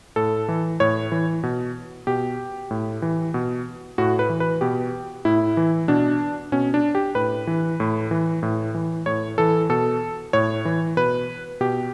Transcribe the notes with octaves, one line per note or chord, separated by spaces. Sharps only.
A2 A4
E3
A2 C#5
E3
B2
B2 G4
A2
E3
B2
A2 F#4
B4
E3
B4
B2 G4
A2 E4
E3
B2 D4
B2 C#4
D4
G4
A2 B4
E3
A2
E3
A2
E3
A2 C#5
E3 A4
B2 A4
A2 C#5
E3
B2 B4
B2 G4